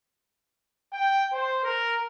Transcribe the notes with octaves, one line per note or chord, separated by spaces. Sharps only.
G5
C5
A#4